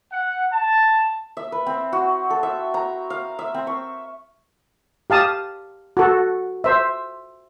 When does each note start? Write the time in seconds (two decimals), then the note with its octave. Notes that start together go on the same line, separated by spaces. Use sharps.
0.12 F#5
0.52 A5
1.37 E5
1.52 B4
1.66 C4
1.93 F#4
2.30 A4
2.43 E5
2.74 A#5
3.10 F5
3.39 E5
3.54 C4
3.67 C#6
5.10 G4 F5 A5 D#6
5.97 F#4 A4
6.64 C5 E5